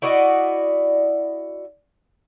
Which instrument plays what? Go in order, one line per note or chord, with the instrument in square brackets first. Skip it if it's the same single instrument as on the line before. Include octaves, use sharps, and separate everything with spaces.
[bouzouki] E4 F#4 D5 D#5